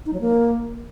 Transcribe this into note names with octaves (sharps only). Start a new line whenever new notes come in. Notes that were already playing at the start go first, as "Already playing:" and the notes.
D#4
F#3
A#3